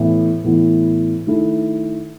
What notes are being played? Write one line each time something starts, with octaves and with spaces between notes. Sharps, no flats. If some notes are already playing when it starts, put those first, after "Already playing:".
Already playing: A2 E3 B3 E4
A2 E3 B3 E4
D#3 A3 E4 A4